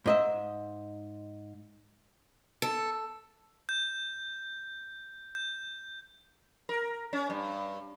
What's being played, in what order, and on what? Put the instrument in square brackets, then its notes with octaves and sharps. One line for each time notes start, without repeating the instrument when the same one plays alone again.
[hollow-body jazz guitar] G#2 D#5 E5
[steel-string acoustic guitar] A4
[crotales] G6
G6
[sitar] A#4
C#4
G2